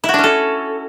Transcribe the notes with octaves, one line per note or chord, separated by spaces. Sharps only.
E4
F#4
D4
C#4
A4